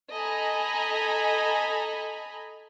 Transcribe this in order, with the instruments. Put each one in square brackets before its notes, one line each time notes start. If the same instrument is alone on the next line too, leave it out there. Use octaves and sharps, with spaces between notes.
[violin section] A4 D#5 G#5 A#5 B5